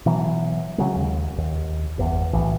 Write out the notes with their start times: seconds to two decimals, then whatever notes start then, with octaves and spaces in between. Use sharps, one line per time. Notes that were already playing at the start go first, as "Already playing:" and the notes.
0.06 B2 E3 F#3
0.78 C#3 F#3 G#3
0.96 D#2
1.38 D#2
1.98 G1 E2
2.33 B1 A2 E3